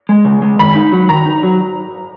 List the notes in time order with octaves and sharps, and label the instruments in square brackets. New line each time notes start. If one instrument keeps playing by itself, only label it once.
[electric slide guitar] G#3
C#3
G#3
[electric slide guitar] D#3 [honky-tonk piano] B5
[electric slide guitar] D#4
F#3
[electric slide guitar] D#3 [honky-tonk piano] A#5
[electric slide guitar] D#4
F#3